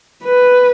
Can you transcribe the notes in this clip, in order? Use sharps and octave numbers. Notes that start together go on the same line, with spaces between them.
B4